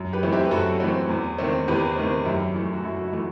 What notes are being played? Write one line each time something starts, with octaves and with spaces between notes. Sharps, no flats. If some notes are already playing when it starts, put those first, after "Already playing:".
Already playing: F#2
G4 B4
E3 A3 C4
E4 G4
B4
F#2 F#4 A4
E3 A3 C4
E2
D#3 A3 C4
E2 G4 B4
D#3 A3 C4
F#2 E4 G4
E3 A3
F#4
F#2 E4
F#4
E4
E3 A3